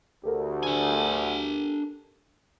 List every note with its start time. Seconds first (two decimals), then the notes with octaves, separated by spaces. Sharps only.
0.23 D2 G4 A4 A#4
0.63 D4 G#5